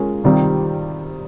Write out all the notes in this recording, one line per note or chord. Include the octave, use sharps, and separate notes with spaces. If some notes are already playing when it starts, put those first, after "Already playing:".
Already playing: G#3 C#4 F4 A#4
C3 D#3 G3 C4 F4